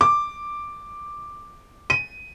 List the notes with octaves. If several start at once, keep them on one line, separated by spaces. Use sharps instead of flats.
D6
D#7